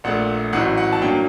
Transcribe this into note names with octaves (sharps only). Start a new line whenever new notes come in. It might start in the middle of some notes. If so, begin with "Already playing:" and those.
A#1 A#2 A3 F#5
A1 A2 F#3 F#5
F#5
A5
G2 F#3 A#3 G5